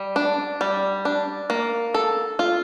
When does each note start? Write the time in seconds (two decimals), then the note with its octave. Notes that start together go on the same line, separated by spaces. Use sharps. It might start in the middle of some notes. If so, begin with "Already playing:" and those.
Already playing: G3
0.16 D4
0.61 G3
1.05 D4
1.50 A#3
1.94 A4
2.39 F4